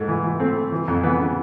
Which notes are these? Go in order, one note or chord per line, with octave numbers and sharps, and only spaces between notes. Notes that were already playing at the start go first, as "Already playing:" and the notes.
Already playing: G#2 A3
E3
E3
A3 C4
A3
E3
F2
E3 B3
C#3